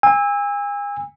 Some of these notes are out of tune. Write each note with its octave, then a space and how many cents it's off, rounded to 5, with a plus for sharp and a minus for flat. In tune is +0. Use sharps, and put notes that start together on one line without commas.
G#5 -35 E6 -10